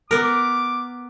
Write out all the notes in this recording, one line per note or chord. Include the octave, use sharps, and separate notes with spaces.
B3 A#4 D6